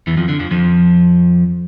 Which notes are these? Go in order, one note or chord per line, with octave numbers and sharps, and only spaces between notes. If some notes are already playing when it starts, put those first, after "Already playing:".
E2 E3
F2 F3
D3
F2 F3
F2 F3